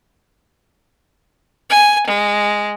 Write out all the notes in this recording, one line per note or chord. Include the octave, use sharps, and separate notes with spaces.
G#5
G#3